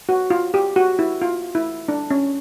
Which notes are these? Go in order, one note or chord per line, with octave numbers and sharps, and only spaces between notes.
F#4
F4
G4
F#4
E4
F4
E4
D4
C#4